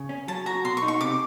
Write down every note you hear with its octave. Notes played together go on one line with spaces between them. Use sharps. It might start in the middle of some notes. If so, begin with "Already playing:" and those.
Already playing: C#3
C#4
F#3 A5
F#4 A#5
B2 C6
C#6
D#4
C#6
C3 D6